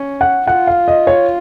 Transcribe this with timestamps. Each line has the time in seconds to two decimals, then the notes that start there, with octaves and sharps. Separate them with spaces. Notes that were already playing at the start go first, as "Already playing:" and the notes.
Already playing: C#4
0.21 F#5
0.47 F4 F#5
0.67 F5
0.88 D#5
1.07 C#5